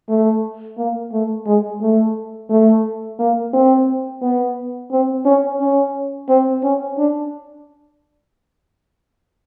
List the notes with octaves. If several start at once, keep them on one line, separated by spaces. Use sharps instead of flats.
A3
A#3
A3
G#3
A3
A3
A#3
C4
B3
C4
C#4
C#4
C4
C#4
D4